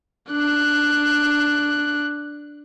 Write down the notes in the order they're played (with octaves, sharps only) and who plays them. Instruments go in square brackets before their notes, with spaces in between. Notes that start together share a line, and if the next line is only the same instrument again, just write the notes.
[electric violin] D4 F#6